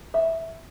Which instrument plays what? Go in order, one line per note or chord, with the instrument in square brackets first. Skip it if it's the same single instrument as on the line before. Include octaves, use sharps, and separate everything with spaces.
[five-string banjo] E5